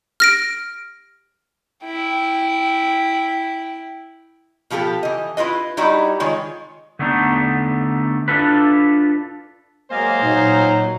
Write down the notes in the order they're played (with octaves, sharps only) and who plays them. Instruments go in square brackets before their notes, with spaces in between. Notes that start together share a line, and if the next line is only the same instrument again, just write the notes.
[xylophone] F6 A#6 D7
[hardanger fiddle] E4 G5
[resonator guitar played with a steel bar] B2 F3 F4 G4 A4
E3 D#5
E4 F4 B4 D#5
G3 D#4 E4 F#4 D#5
D#3 G#3 F4 C#5
[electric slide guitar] D3 A3 B3 D4 D#4
D4 E4 F4 A4 B4
[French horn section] F#3 G#3 A#3 [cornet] C5 [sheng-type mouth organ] D#5 F5 G#5
[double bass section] A#2 [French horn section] F#3 D#4